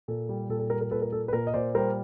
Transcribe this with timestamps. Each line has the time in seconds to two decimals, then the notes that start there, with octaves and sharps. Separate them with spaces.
0.08 A#2 A4
0.29 G3
0.49 A#2 A4
0.59 A4
0.70 G3 A#4
0.81 A#4
0.91 A#2 A4 B4
1.02 A#4
1.12 A#3 A4
1.28 B4
1.33 A#2 A#4
1.47 D#5
1.54 A#2 C5 D5
1.75 G3 A#4 C5